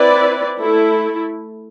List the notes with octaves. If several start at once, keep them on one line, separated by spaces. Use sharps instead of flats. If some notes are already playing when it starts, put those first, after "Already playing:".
Already playing: C4 E4 B4 D5
A3 E4 A4